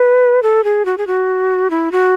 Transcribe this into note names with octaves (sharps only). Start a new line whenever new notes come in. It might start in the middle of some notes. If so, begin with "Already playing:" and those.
Already playing: B4
A4
G#4
F#4
G#4
F#4
E4
F#4